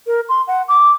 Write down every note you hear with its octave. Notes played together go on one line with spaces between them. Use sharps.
A#4
C6
F#5
D6